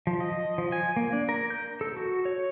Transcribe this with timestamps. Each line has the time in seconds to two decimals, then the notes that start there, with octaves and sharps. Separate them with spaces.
0.07 F3
0.20 D#5
0.58 F3
0.72 G#5
0.97 A#3
1.13 D4
1.29 A#4
1.50 G6
1.81 A4
1.97 F#4
2.25 C#5